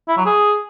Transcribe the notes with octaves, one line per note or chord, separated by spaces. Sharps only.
E4
F#3
G#4